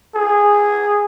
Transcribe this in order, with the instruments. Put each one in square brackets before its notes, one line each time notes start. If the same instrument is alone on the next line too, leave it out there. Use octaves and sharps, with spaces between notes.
[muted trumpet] G#4